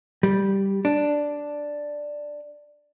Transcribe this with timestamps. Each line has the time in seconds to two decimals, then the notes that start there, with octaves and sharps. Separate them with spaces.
0.23 G3
0.85 D4